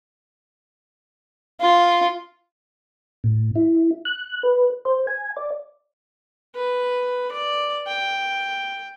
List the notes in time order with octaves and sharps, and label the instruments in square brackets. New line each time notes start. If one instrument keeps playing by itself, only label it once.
[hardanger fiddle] F4
[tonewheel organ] A2
E4
F#6
B4
C5
G#5
D5
[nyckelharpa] B4
D5
G5